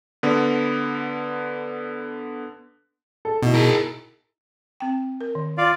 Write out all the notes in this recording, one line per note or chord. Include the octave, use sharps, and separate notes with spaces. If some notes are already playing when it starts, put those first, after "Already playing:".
D3 B3
A4
B2 D#4 E4
G#4 A#4
C4 G5
A#4
D#3
F4 D5 F5